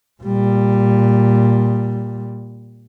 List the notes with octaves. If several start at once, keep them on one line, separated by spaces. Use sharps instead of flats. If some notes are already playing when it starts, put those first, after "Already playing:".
A#2 G3